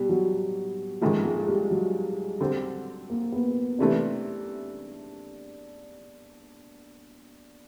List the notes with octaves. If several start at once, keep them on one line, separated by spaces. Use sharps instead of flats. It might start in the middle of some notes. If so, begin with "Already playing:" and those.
Already playing: B2 G3
F#3
A1 G#2 D#3 F3
G#3
G3
F#3
D3 G3 C4
A#3
B3
C3 E3 A3 D4